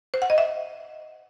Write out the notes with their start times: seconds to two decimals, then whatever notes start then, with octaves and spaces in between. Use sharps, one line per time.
0.14 C5
0.22 F#5
0.30 D#5
0.38 E5